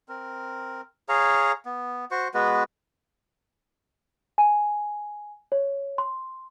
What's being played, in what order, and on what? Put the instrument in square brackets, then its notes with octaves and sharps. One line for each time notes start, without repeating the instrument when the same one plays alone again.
[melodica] C4 A#4
G#4 C#5 F5 A#5
B3
F#4 C5 C#6
G#3 B3 F#4 B4
[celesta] G#5
C#5
C6